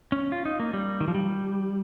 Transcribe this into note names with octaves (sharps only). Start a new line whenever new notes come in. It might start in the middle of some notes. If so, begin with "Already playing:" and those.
C#4
F4
D#4
A#3
G3
D#3
F3
G3